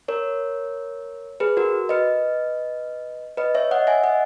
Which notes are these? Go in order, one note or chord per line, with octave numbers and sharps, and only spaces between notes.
A#4 C#5
G#4 B4
F#4 A#4
B4 D#5
B4 D#5
C#5 E5
D#5 F#5
E5 G#5
D#5 F#5